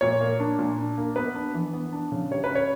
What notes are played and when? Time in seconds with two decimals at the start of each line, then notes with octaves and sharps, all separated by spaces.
0.01 A#2 C#5
0.21 A#3
0.40 D4
0.59 A#2
0.78 D4
0.98 A#3
1.16 B3 B4
1.35 D4
1.54 E3
1.73 B3
1.93 D4
2.12 C#3
2.31 G3 C#5
2.44 B4
2.50 C#4 C#5